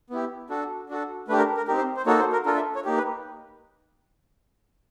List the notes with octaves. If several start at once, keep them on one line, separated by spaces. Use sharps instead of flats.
B3 E4 G4
D4 F#4 A4
D4 F#4 A4
A3 D4 G4 B4
A#4
A#4
C4 D#4 G4 A#4
C5
C5
A#3 D#4 F#4 A4 C#5
C5
A#4
D4 F4 A4 A#4
E5
C#5
A#3 D#4 G4
B4